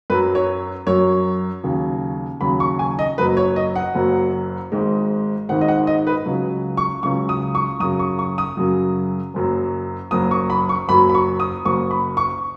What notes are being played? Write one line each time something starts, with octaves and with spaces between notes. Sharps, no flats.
F#2 F#3 B4
C#5
F#2 F#3 C#5
D#2 C#3 F#3
D#2 C#3 F#3 B5
C#6
G#5
D#5
F#1 F#2 F#3 B4
C#5
D#5
F#5
F#1 F#2 F#3
G#1 G#2 D#3 G#3
G#1 G#2 D#3 G#3 F#5
D#5
F#5
D#5
B4
C#2 C#3 F#3
C#6
C#2 C#3 F#3 C#6
D#6
C#6
F#2 C#3 F#3 D#6
C#6
C#6
D#6
F#2 C#3 F#3
F#1 F#2 F#3
F#1 F#2 F#3 D#6
C#6
B5
C#6
F#1 F#2 F#3 B5
B5
C#6
D#6
F#1 F#2 F#3 C#6
B5
C#6